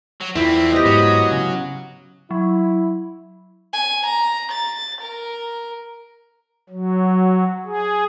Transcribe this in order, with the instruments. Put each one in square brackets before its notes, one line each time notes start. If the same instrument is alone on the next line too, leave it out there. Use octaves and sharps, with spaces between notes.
[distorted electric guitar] F#3
[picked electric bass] E2 [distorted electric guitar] D3 C4 [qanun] E4 F4
[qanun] B3 G4 [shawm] D#5
[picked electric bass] G#2 [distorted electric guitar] F#3
[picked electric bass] C#3
[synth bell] F#3 [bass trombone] E4
[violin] G#5
A#5
A6
A#4
[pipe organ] F#3
G#4